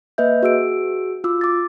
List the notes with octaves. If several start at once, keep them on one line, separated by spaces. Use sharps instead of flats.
A#3 B4 D#5 E5 G6
F#4 G#4 E6 D7
F4 D6 E6
D6 A6